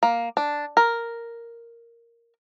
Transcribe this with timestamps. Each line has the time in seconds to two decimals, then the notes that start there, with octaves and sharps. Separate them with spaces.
0.03 A#3
0.37 D4
0.77 A#4